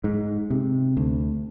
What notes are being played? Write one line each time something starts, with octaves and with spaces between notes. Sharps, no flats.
G#2
C3
D2